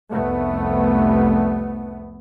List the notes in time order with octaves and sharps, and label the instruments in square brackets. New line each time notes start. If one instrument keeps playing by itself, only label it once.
[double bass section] F1 C2 A3 B3